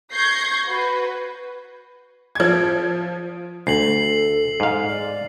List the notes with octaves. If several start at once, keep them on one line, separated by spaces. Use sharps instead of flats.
C#6 G6 G#6 A#6 C7
F#4 B4
F3 G#6
D2 A4 C7 F#7
G#2 F5
D5